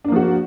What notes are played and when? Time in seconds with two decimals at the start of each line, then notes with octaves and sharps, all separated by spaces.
0.05 D4
0.08 A#3
0.12 F3
0.16 F#4